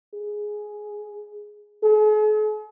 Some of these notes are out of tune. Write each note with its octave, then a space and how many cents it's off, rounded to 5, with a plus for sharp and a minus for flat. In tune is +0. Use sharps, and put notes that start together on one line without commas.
G#4 +10
G#4 +45